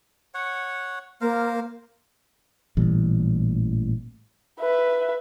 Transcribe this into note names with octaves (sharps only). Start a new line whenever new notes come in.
C#5 F#5
A#3 A#4 C5 F5
A1 A#2 E3 G3
B4 E5